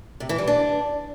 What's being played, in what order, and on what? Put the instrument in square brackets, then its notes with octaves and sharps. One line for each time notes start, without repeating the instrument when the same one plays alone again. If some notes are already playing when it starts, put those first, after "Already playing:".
[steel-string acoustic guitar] C3
E3
G3
D4